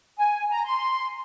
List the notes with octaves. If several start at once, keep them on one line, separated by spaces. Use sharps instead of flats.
G#5
A#5
C6